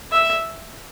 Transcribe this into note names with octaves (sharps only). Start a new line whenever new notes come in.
E5